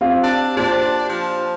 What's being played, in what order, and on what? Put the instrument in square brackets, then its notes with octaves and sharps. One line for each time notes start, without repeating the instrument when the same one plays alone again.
[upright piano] C4 F4 G4
[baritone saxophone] D4
[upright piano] A#2 G4 C5 [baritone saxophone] D4
[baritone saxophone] F3